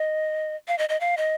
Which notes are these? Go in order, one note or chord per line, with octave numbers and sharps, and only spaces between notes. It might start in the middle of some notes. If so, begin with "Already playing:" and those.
Already playing: D#5
F5
D#5
D#5
F5
D#5